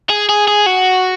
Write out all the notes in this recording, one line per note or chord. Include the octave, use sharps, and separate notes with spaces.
G#4
G#4
G#4
F#4